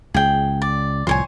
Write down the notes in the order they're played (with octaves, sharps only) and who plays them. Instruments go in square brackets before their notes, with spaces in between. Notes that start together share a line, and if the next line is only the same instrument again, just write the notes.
[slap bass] C#2 [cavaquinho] G#4 G5
[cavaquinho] D5
[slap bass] C2 A2 F3 [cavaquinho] C5 C#5 G#5